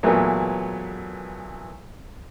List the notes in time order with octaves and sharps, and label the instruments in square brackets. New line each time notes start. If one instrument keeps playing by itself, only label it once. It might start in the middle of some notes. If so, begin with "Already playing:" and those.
[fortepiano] A#2 E3 F#3 G#3 A3 B3